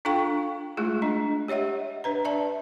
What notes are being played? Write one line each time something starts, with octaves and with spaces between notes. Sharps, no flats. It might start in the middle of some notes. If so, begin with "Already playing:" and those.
D4 F4 A4 F5 G5 C#6
G#3 A3 E4 F4 G#4
D4 D#5
G4 C#5 D#5 E5 F#5
D4 B4 A#5
D5 E5 A5